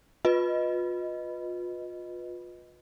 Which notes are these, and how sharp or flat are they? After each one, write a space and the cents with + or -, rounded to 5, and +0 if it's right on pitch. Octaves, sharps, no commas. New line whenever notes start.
F4 +35 B4 +0 D#5 +0